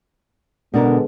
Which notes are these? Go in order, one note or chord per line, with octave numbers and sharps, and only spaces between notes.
B2 D3 G#3 B3 D4 A#4